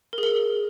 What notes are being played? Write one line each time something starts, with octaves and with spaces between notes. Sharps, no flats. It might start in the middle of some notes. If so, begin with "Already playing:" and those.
A#4
G#4
A#4